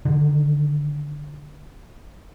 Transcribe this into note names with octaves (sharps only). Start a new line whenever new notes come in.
D3 D#3